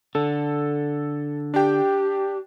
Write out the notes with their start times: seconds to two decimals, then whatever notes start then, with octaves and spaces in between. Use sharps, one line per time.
0.15 D3 A4
1.54 D4 G4 G5